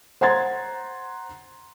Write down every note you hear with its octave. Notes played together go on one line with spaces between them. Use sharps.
C5 F#5 A#5 C6 G#6 A6